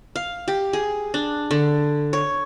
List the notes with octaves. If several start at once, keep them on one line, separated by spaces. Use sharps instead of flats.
F5
G4
G#4
D4
D3
C#5